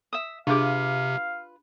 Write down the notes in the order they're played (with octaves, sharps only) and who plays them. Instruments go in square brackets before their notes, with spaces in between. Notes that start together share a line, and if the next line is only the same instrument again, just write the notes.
[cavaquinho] E5 D#6
[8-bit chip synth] C3 [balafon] D4 G4 G#4 [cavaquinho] F4 B4 D6 [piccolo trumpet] F5